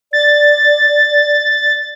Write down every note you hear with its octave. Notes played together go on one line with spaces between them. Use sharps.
D5 A6